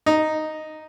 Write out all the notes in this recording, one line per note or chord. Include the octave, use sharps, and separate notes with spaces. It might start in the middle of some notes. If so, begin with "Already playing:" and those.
D#4